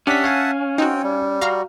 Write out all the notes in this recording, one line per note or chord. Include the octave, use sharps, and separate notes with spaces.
C#4 D4 G4 E5 F#5 A5 B6
C#5 F5 G#5
C4 D#4 F#4 G5
G3
F#4 F5 A#5 F6